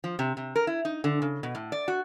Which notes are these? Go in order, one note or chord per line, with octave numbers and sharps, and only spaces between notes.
F3
C3
C3
A#4
E4
D#4
D3
C#3
B2
A2
D5
F#4